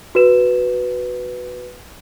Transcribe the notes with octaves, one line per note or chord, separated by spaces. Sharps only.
F#4 B4 E7